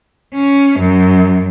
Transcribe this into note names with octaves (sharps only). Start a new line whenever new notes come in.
C#4
F#2